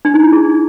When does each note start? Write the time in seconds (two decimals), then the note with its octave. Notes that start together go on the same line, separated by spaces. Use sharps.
0.05 D4
0.14 D#4
0.23 E4
0.33 G#4